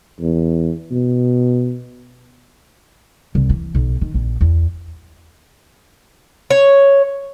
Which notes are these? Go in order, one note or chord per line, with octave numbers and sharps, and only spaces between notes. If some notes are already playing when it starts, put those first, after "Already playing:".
E2
B2
C2
E3
B1
D#3
A#1
E2
C#5